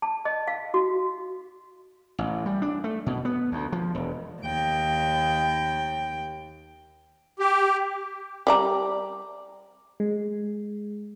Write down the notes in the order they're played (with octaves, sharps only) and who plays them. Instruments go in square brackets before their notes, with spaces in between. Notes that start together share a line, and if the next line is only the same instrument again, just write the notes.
[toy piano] A5
D#5
F5
F#4
[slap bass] A1
G3
D4
A3
B2
B3
D2
F3
E1
[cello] D#2 G5
[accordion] G4
[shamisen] G3 D5 A#5
[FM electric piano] G#3